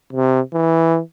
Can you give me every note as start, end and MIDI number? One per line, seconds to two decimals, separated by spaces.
0.13 0.41 48
0.53 0.99 52